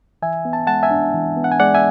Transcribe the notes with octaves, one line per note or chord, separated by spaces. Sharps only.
E3 E5 G#5
B3
A5
G#3 F#5 A5
E5 G#5
D4
E3
B3
F#5
G#5
G#3 D5 F#5
E5 G#5